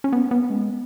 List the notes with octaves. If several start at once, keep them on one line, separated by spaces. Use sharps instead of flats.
C#4
B3
B3
G#3